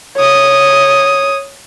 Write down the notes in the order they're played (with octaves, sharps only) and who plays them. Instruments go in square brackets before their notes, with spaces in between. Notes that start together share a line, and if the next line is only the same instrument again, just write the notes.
[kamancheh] C#5 D#6